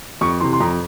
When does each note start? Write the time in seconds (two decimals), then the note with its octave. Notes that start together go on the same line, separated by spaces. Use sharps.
0.21 F2 C#6
0.40 C3 E3 C6
0.53 C6
0.60 F2 A#5